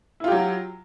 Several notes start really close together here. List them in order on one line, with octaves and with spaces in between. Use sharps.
E4 F4 G4 F#3